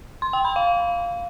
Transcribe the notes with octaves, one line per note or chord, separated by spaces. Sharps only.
C6
G5
B5
F5